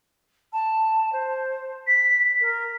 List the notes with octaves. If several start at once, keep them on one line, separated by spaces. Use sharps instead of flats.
A5
C5
B6
A#4